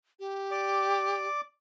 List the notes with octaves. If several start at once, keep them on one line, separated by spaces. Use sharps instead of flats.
G4
D5 D6